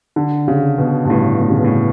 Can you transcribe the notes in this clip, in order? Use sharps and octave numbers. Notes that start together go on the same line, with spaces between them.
D3
C#3
B2
G2
A2
A2
C#3
B2
A2